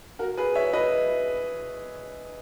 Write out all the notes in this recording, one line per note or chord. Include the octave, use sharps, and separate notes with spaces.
F#4 A#4
G#4 B4
C#5 E5
B4 D#5